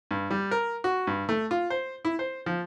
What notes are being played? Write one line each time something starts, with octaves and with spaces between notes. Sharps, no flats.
G2
G3
A#4
F#4
G2
A3
F4
C5
E4
C5
F3